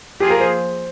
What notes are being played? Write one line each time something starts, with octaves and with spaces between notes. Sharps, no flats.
F3 A#3 F4 G4 G#4
A#4
C5